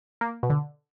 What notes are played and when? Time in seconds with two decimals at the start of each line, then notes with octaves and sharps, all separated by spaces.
0.21 A#3
0.43 B2
0.50 D3